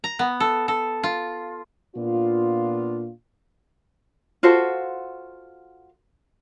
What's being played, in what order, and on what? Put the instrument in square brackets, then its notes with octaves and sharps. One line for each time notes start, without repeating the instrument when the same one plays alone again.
[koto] A#5
B3
A4
A4
F4
[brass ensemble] A#2 B3 D4 F4
[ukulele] F4 F#4 A4 C5